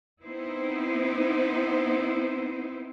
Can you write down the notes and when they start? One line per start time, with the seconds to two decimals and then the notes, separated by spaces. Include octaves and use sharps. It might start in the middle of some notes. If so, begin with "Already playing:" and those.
0.23 B3 C4 D#4 E4 C5